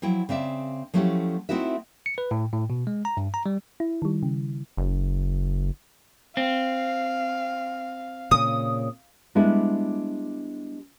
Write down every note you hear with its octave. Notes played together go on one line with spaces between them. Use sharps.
F3 F#3 E4 G5
C#3 C4 D5 E5
F3 F#3 A3 C#4 E4 G4
A3 C4 D#4 E4 F#4 E5
C#7
B4
A2
A2
B2
G#3
A#5
G2
A#5
G3
E4
D#3 G3
C#3
F#1
C4 F5
A#2 C#3 D#6
G3 G#3 B3 D4 E4 G4